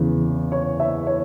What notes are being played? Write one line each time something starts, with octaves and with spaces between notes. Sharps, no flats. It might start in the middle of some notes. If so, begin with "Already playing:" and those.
Already playing: E2 C#3 E3
C#5
E5
C#5